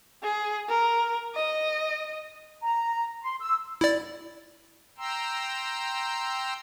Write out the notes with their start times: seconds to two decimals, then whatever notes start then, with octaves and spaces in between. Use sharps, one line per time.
0.23 G#4
0.69 A#4
1.35 D#5
2.63 A#5
3.23 C6
3.41 E6
3.81 E4 D5
4.98 G5 A#5 C6 E6